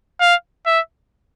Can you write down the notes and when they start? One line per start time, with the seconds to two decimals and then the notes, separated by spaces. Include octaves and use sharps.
0.21 F5
0.66 E5